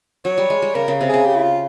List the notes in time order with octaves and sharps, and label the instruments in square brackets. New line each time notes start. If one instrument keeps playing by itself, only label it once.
[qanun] F#3 [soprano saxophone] C#5
[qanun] G3
G#3
G3
[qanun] C#3 [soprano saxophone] A#4
[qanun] C#3
C3
[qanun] C#3 [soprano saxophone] G#4
[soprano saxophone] G4
E4
F4